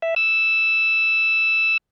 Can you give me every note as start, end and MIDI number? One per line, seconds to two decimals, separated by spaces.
0.02 0.14 76
0.16 1.77 88